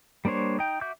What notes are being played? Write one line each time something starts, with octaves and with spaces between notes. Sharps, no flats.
G3 A#3 D4 C5 C#5
D#4 G5
F#4 E5 D6 G6